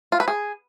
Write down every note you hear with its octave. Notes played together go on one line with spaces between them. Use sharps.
F4
B4
G#4